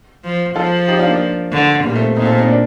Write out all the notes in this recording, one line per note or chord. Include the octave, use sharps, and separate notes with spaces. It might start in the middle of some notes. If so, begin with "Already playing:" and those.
F3
F3 F4 A4
D#4 G4
D4 F4
A#3 D4
D3
A#2 G3 A#3
A3 C4
A#2 C4 D#4
A4 C5
C4 D#4
A#3 D4